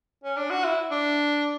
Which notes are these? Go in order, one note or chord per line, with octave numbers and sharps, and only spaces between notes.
C#4
D4
F#4
E4
D4